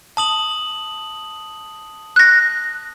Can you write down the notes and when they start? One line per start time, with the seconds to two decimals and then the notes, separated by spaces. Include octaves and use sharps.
0.17 A5 D#6 F#7
2.16 F#6 A#6